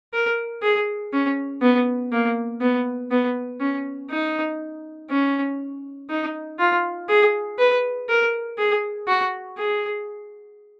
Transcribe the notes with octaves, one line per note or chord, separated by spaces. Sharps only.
A#4
G#4
C#4
B3
A#3
B3
B3
C#4
D#4
C#4
D#4
F4
G#4
B4
A#4
G#4
F#4
G#4